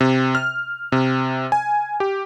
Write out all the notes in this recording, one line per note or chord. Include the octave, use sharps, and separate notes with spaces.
C3
F6
C3
G#5
G4